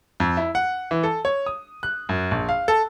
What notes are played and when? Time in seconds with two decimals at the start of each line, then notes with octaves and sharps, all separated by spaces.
0.20 F2
0.37 E4
0.55 F#5
0.91 E3
1.03 A4
1.25 C#5
1.46 D#6
1.83 F#6
2.09 F#2
2.31 A#1
2.49 F5
2.68 A4